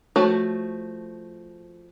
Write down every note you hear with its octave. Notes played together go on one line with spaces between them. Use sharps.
F3 A3 F#4 C#5